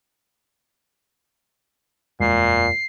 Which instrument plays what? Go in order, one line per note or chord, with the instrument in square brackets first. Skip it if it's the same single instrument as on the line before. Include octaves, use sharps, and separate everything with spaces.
[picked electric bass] F#1 E2 G#3 [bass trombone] A#2 [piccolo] C7